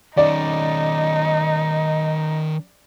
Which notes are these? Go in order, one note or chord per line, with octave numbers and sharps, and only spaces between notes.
D#3 C#4 D#4 D5 D#5